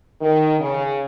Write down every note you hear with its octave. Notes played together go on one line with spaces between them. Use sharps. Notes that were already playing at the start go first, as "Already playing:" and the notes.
D#3
C#3